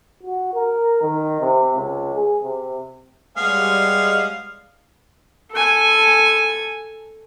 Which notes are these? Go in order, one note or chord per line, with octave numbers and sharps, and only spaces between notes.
F#4
A#4
D#3
C3
C#2
G#4
C3
G3 G#3 B3 C#4 F5 G#5
A4 G#5